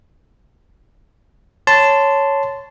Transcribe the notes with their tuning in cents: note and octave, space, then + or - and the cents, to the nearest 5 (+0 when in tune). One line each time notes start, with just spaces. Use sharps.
C#5 +0 A5 +0 C6 -20